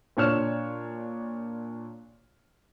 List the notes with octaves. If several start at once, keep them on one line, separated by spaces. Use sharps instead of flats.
A#2 D4 C#5 F6 E7